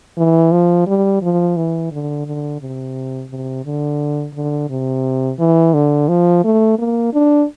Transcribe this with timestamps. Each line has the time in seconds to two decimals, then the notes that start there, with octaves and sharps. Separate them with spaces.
0.18 E3
0.52 F3
0.87 G3
1.22 F3
1.57 E3
1.92 D3
2.26 D3
2.61 C3
3.30 C3
3.65 D3
4.35 D3
4.70 C3
5.39 E3
5.74 D3
6.08 F3
6.44 A3
6.79 A#3
7.13 D4